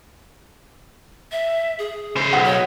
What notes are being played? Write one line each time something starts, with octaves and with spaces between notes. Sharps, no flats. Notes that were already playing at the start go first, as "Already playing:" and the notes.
E5
G#4
C#3 C5
B1 F#5 D#6 B6
C#5